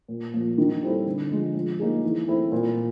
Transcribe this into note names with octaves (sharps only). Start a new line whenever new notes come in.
A#2
F3 A#3
D#3
G3 C4 E4 A4
D3
F3 G#3
F3
A#3 D#4 G#4
E3
A3 C4 E4
A#2